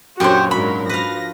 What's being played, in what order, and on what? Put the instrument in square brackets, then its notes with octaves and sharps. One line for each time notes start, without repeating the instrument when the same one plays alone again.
[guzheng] F#2 A#2 D4 [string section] F#4 C#5 [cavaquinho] G4 C5
[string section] G#2 F#3 A#4 [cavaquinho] B5
[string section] F3 A#6 [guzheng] B4 F5